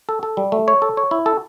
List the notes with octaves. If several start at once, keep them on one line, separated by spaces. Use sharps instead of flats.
A4
A4
G3
A3
C#5
A4
C#5
E4
A4